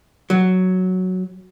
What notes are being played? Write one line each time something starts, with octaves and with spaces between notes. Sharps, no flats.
F#3